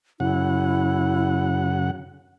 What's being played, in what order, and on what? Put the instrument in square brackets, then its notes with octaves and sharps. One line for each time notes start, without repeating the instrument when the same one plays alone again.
[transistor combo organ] F#2 C#3 F#5 [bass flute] E4